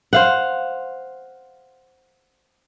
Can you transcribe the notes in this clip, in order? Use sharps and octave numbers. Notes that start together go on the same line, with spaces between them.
C5 F5 F#5